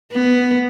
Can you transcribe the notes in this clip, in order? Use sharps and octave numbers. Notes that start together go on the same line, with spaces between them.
B3